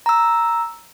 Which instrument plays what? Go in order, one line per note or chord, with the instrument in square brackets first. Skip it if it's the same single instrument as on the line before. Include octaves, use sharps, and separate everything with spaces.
[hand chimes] A#5 E6